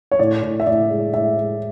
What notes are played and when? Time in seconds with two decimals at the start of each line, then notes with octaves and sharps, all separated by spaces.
0.11 C#5
0.19 A2 D5
0.43 A2
0.60 E5
0.67 A2 D5
0.91 G#3
1.14 A2 E5
1.37 G#3